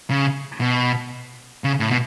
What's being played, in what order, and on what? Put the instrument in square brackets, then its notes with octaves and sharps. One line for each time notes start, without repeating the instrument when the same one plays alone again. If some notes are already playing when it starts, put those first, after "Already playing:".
[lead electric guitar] C#3
B2
C#3
A2
B2